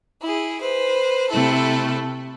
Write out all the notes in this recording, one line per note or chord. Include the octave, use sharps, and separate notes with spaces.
E4 G#4
B4 C5
C3 A3 E4 A4